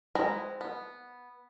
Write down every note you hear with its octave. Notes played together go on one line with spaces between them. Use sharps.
G#3 C4 B4 G#5 A#5
B3